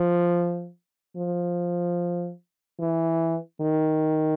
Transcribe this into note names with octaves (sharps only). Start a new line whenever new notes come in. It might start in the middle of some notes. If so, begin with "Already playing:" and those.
Already playing: F3
F3
E3
D#3